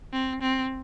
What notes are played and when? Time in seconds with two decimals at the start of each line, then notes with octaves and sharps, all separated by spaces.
0.13 C4
0.41 C4